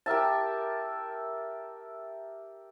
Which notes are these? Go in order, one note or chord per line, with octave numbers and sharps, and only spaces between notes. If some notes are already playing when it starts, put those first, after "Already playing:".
G4 A#4 E5 A5